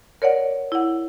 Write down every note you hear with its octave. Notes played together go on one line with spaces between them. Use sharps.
A#4 C#5 D5 F#5
E4 F#5